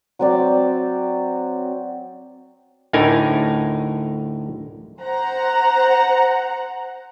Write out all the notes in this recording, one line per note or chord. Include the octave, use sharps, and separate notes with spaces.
F#3 C4 D5
D2 A2 D3 D#4 A#4 G#5
C5 F#5 A#5